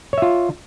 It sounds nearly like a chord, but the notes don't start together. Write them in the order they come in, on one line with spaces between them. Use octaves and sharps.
C#5 E5 F4